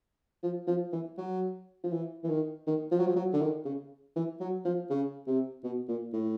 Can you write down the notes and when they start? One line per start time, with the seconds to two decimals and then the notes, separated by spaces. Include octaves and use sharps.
0.43 F3
0.67 F3
0.93 E3
1.18 F#3
1.84 F3
1.92 E3
2.24 E3
2.29 D#3
2.67 D#3
2.91 F3
2.99 F#3
3.07 F3
3.16 F#3
3.33 D3
3.42 D#3
3.65 C#3
4.16 E3
4.40 F#3
4.65 F3
4.90 C#3
5.27 C3
5.64 B2
5.89 A#2
6.13 A2